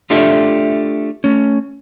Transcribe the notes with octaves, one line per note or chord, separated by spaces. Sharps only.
A3 D4 F4 G4 A4 E5
A3 C#4